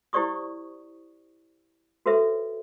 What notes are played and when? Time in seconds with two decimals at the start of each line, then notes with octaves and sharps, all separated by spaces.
0.13 E4 G4 C5 D5 C#6 D#6
2.06 F#4 A4 B4 C5 E5